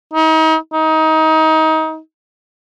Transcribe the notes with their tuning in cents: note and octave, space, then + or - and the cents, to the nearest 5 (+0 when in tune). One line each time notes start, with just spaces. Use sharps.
D#4 +35
D#4 +25